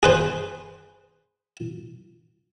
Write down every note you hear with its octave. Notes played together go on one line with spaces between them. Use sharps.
G#4 B4 C5